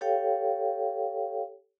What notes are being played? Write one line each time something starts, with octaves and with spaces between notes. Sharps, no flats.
G4 A4 C#5 F5 G5